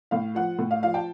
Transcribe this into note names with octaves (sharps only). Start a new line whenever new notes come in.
A2 F5
F3 F#5
A2
F5
F3 F5
G5 A5